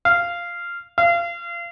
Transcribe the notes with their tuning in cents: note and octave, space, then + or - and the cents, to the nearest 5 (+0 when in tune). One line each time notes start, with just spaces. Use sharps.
F5 -10
F5 -30